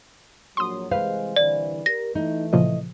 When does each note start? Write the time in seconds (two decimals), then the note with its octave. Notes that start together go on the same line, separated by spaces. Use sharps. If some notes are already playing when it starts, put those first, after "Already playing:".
0.57 A#1 F#3 C6 D#6
0.91 C2 E3 G#3 B4 C5 F5
1.36 C2 D3 E3 D5
1.86 G4 A#4 A#6
2.15 E3 A3 D#4
2.53 A#2 C#3 F3 D#5